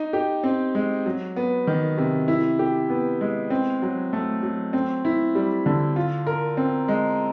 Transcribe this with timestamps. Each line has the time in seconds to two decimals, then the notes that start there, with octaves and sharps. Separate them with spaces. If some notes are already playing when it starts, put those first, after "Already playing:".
Already playing: D#4
0.13 G4
0.44 C4
0.75 G#3
1.06 F#3
1.36 B3
1.67 D#3
1.98 C3
2.28 E4
2.59 G4
2.90 B3
3.21 G#3
3.50 C4
3.82 F#3
4.13 A3
4.43 F#3
4.73 C4
5.05 E4
5.35 G3
5.66 D3
5.96 F4
6.27 A#4
6.57 C4
6.88 G#3